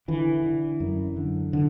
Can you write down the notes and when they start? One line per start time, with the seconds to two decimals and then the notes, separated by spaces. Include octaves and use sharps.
0.08 D3 E3
0.44 D3
0.80 F#2
1.16 D3
1.53 D3